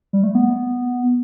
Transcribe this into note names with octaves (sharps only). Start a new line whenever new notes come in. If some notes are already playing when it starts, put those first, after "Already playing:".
G3
A3
B3